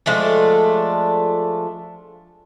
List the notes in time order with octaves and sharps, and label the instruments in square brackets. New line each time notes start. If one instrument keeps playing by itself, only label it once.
[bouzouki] F3 G#3 A3 D4